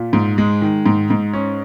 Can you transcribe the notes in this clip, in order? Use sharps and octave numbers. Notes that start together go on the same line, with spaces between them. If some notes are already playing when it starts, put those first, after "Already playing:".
Already playing: A#2
G#2
G#3
D#3
G#2
G#2
C#4